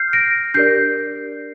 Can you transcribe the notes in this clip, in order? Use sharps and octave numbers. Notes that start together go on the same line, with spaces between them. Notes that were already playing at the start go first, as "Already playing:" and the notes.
Already playing: F6 G6 C7
A#6 D7
D4 G4 A#4 D5 G6 C7